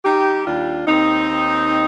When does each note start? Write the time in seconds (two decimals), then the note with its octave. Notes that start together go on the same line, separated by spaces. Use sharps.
0.05 G3 D#4 G4
0.47 D#2 D4 F4
0.87 D#2 C4 D#4
1.30 D#2